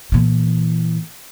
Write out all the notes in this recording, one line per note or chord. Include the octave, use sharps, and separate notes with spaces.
A#2 E3